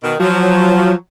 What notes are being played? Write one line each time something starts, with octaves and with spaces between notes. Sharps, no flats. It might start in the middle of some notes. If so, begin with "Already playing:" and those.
B2 D#3
F3 F#3